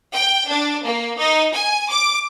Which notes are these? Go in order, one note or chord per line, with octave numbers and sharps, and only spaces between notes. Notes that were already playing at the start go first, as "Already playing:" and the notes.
G5
D4
A#3
D#4
G#5
D6